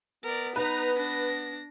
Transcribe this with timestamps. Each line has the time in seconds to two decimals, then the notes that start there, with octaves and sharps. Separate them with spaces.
0.24 B3 A#4 D5
0.56 D#4 B4 A#5
0.98 D4 A#6